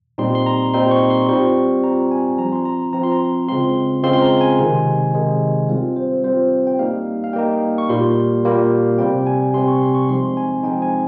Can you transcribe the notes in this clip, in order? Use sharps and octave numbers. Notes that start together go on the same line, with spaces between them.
A#2 G3 C4 D#4 C6
C6
A#5
A#2 G3 C4 D#4 C6
C#6
C6
G3 C4 F4 C#6
G3 C4 F4 A#5
G#5
F3 C4 F4 A#5
C6
A#5
F3 C4 F4 A#5
C6
A#5
C#3 G#3 C4 F4 C6
C#3 G#3 C4 F4 C6
C6
A#5
G#5
C3 D#3 G#3
C3 D#3 G#3
G3 C4 F4 F5
C5
G3 C4 F4 C5
G5
G3 A#3 D#4 F5
F5
G3 A#3 D#4 G5
C#6
A#2 G3 A#3 F4 C6
A#2 G3 A#3 F4
C3 G3 C4 G5
G#5
C3 G3 C4 C6
C#6
C6
C#6
F3 G#3 C4 D#4 C6
G#5
F3 G#3 C4 D#4 G5
G#5